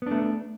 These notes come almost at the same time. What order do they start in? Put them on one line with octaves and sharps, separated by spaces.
B3 D4 A3